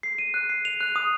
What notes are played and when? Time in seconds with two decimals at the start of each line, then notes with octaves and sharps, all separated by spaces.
0.03 C7
0.18 D#7
0.34 F#6
0.50 C7
0.65 F7
0.81 F#6
0.96 D#6